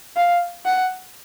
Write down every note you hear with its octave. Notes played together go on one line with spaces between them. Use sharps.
F5
F#5